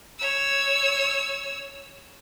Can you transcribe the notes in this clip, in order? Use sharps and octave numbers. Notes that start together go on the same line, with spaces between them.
C#5 E6